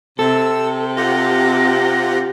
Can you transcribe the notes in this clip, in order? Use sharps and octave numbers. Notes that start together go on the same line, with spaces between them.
C3 A4 E6
F4 G4 F#5 A#6